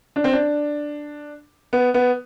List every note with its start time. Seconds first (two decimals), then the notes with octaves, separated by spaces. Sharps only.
0.16 D4
0.24 C4
0.33 D4
1.73 B3
1.94 B3